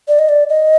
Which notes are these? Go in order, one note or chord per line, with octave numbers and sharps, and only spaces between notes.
D5
D#5
D5
D#5